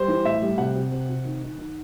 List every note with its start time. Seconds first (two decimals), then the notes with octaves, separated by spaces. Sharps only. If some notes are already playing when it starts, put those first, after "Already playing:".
Already playing: G3 C5
0.08 E3
0.25 A2 E5
0.42 G3
0.58 C3 F#5
0.75 C3
0.91 C3
1.09 C3
1.25 D#3
1.42 D#3
1.58 D#3